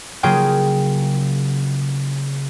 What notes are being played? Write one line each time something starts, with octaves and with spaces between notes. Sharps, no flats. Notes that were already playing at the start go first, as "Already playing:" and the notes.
C#3 F#3 A#3 F4 G#4 G5